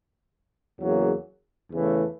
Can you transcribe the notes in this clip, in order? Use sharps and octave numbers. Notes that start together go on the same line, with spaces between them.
E2 C#3 F#3 A#3
E2 C#3 E3 A3